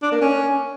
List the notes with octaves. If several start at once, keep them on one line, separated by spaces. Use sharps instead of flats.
D4
A#3
C#4